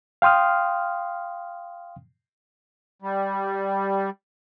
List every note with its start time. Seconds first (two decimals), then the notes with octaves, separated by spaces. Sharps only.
0.22 F5 G5 C6 D#6 F6
3.01 G3